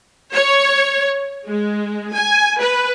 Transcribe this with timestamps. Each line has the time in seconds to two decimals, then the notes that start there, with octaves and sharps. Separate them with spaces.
0.33 C#5
1.47 G#3
2.13 G#5
2.60 B4